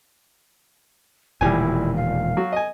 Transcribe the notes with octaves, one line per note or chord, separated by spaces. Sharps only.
E1 A#2 D#3 G3 E4 G#5
F5
F#3 F#4
D#5 G#5